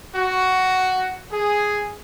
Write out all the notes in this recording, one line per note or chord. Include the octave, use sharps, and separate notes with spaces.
F#4
G#4